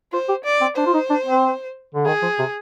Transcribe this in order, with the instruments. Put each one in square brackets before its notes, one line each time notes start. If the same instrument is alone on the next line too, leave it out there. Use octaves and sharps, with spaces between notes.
[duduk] F4 [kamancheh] C5
[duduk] G4
[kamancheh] D5
[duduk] C4
[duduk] D4 [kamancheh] C5
[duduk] F4
D#4
D4
C4
D3
[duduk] D#3 [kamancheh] G#4
[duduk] F3
C3